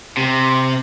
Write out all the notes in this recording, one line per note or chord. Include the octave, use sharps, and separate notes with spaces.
C3